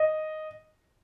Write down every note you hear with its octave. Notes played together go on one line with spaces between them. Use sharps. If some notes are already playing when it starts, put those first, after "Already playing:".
Already playing: D#5